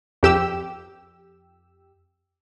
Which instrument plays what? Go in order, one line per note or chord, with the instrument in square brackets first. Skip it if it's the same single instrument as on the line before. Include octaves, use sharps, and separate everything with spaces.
[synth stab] F2 G4 E6